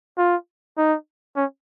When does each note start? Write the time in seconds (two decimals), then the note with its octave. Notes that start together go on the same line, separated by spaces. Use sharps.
0.18 F4
0.77 D#4
1.36 C#4